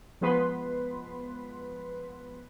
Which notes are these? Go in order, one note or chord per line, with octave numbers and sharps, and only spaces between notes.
F3 G#3 B3 B4 C6 B6